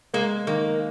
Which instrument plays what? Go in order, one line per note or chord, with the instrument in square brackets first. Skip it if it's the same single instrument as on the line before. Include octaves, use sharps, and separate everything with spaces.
[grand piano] G#3 [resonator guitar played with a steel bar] A#3
[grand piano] D#3 [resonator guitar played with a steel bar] A#3